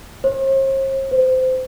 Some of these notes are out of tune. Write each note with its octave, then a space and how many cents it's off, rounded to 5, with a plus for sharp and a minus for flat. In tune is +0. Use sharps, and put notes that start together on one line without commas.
C5 +45
C5 -20